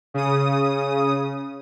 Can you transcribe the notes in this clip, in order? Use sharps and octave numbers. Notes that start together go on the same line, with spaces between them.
C#3 D#6